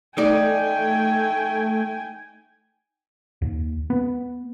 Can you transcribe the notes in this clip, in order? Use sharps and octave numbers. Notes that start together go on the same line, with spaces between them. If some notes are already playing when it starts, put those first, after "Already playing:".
A3 D#4 D5 G5 G#5
D#2
B3